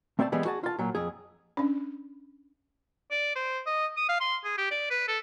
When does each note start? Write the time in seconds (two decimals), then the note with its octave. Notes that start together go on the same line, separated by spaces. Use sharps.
0.19 A3 C4 D5 G#5 A5
0.32 E3 G3 G#3 B3 G#4 B4
0.45 F#4 G#4 A5
0.63 F4 A5
0.79 A#2 F#3
0.95 F2 G#4
1.57 C#4 D4
3.11 D5
3.36 C5
3.66 D#5
3.97 D#6
4.09 F5
4.20 C6
4.44 G#4
4.58 G4
4.71 D5
4.90 B4
5.08 A4